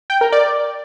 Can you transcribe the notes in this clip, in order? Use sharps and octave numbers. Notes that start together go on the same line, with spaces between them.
G5
A#4
D5